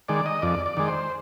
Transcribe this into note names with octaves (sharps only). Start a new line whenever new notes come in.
D#3 G#3 D5
D#5
F2 D5
D5
D#3 G#3
C5